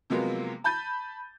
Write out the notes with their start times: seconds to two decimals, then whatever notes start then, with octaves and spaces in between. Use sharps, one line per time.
0.10 C3 F3 F#3 G#3 A#3 B3
0.64 A5 B5 G6 A6 D#7